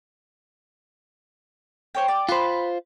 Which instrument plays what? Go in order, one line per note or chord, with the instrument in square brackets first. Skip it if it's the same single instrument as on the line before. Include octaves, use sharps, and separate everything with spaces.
[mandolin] C5 C#5 G5
D5
[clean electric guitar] F4 C5 [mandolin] B4 B5 C6